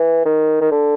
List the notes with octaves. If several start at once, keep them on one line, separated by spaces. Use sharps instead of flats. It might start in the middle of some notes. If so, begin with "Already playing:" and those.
Already playing: E3
D#3
D#3
D3